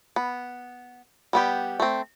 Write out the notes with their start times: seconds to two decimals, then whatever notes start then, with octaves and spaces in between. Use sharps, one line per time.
0.16 B3
1.33 G3 B3 G4
1.80 A3 C4